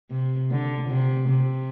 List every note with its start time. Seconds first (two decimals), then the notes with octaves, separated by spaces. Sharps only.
0.11 C3
0.51 D3
0.89 C3
1.28 C3